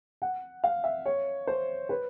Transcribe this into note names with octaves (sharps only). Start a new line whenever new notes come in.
F#5
F5
E5
C#5
C5
B4